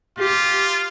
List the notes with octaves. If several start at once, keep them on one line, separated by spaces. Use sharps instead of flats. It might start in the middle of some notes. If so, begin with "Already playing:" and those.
F4 G4